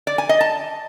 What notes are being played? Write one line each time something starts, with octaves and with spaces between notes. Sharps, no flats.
D5
G#5
D#5
A5